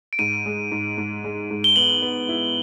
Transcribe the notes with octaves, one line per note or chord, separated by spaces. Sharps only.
D7
G#2 D#7
G#3
G#2
G#2
G#3
G#2
G7
B3 F#7
B3
E4